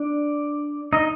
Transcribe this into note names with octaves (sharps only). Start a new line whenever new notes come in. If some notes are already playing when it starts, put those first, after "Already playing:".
Already playing: D4 D5
D#4 D#5